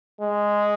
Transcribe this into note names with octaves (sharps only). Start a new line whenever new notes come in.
G#3